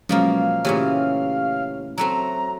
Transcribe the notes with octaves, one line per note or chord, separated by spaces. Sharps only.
B2 F3 F#3 G#3 A#3 C#4 F5
A#2 C#3 E3 A3 G4 C#5
F#3 A3 C4 A#5